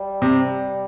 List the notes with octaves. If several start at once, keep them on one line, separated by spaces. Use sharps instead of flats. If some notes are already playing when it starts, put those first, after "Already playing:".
Already playing: G3
C3